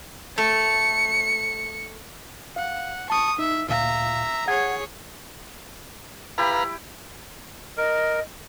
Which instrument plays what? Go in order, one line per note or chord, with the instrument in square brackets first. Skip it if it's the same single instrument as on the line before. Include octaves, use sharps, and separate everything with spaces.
[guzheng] A3 [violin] C#7
[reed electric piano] F5 [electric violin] F#5
[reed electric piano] A5 [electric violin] C#6 D#6
[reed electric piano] D#4 [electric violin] E5
[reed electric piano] D2 A#2 F5 [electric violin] E5 A#5
[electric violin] G#4 C#5 [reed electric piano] F#5 G#6
[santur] E4 G4 B5 [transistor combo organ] B4 F5 A#5
[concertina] A#4 [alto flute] D#5